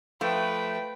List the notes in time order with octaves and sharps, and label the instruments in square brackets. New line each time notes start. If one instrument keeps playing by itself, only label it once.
[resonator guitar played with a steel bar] F3 A3 [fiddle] B4 G5